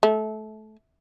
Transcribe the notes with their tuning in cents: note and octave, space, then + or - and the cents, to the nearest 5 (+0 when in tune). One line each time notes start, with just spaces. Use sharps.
A3 -25